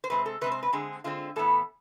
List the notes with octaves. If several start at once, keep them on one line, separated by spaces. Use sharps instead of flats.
C5
C3 G#3 C4 B4
A4
C3 G#3 C4 B4
C5
B4
D3 G#3 C4 G#4
D3 G#3 C4 F4
A2 E3 B3 A4